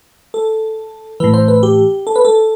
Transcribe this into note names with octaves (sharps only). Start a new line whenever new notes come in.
A4
A2 E3 B4
C5
B4
G4
A4
B4
A4